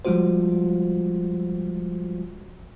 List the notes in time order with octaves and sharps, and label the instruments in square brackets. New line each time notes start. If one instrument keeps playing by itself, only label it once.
[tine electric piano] F3 G3 G#3 F4 F#4 C5